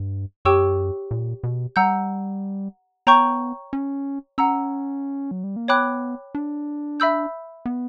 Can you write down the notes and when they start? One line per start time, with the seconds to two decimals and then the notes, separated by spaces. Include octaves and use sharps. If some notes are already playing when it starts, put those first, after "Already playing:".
Already playing: G2
0.45 F#2 G4 C#5 G5 C#6 E6
1.11 A#2
1.43 B2
1.76 G3 F#5 A#5 E6 G6
3.07 B3 C#5 G5 A#5 C#6 G6
3.73 C#4
4.38 C#4 F#5 A#5 E6
5.31 F#3
5.44 G3
5.56 A#3
5.68 B3 C#5 G5 B5 D6 F#6
6.35 D4
7.00 E5 B5 E6 G6
7.66 B3